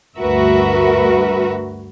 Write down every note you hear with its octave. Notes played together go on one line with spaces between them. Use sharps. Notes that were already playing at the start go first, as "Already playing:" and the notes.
D2 G2 F#4 A#4 B4 E5